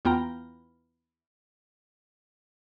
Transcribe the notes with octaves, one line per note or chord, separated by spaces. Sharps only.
E2 B3 F4 G5 A#5